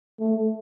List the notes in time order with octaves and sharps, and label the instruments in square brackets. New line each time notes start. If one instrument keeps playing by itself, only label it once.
[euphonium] A3